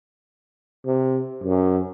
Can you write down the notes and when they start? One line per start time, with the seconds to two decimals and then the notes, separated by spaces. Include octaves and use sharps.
0.85 C3
1.44 F#2